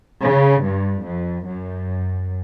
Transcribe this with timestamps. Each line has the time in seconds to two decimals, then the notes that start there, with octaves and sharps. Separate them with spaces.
0.22 C#3
0.62 G2
1.04 F2
1.46 F#2